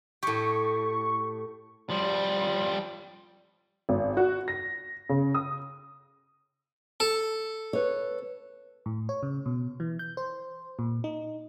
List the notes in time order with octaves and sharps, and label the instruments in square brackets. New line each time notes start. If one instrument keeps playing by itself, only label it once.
[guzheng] A2 G4 [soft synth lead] C#6
[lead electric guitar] F3 G3
[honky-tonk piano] G#1
F#4
A#6
C#3
D#6
[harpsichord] A4
[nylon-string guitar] B4 C#5
[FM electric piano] A2
C#5
C#3
B2
E3
G6
C5
A#2
D#4